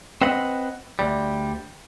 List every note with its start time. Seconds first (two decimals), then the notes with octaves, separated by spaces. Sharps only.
0.21 C4 B4 D#5 F#5
0.99 D2 G3